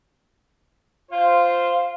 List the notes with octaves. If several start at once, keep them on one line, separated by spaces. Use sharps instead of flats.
F4 C5 F5